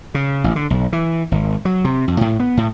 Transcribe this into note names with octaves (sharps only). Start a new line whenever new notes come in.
C#3
A1
D3
B1
E3
G#1
F#3
C3
F2
A2
B3
A2